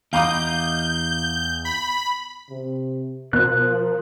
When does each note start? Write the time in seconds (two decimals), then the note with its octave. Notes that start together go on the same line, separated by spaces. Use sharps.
0.13 E2 D#5 F5 A#5 D6 G6
1.65 B5
2.50 C3
3.33 B2 F3 A#4 F#6